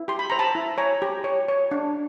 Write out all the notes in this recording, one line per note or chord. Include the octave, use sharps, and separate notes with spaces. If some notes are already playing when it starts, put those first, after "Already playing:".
Already playing: E4
G4 C6
B5
C5 A#5
A5 B5
E4
C#5 G#5 A#5
G4
C#5
C#5
D4